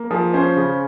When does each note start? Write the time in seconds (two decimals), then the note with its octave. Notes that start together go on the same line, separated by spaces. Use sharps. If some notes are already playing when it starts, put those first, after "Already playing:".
Already playing: A#3
0.11 F3 G#4
0.33 C#4 C5
0.57 C#3